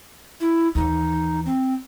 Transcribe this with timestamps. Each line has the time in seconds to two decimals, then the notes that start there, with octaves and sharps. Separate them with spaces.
0.40 E4
0.75 D#2 E3 D#4
1.46 C4